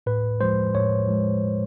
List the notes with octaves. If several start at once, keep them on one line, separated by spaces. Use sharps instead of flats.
A2 B4
F3 G#3 C5
A2 C#5
F3 G#3